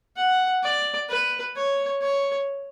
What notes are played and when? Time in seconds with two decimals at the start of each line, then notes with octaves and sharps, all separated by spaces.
0.17 F#5
0.63 D5
1.09 B4
1.56 C#5
2.01 C#5